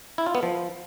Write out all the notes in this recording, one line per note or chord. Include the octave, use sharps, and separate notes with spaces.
E4
F4
B3
F3